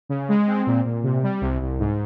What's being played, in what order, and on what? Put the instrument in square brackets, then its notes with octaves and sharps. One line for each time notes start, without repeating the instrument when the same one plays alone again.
[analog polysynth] C#3
G#3
C4
A#2
A#2
C3
G3
C2
C2
G#2